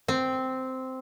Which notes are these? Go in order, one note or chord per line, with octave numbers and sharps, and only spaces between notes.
C4